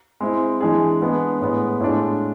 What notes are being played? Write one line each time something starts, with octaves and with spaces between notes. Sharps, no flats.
G#3 C4 E4
E3 G#3 D4 G#4
G#3 B3 D4 G#4
A2 G#3 B3
A2 G#3 D4 F4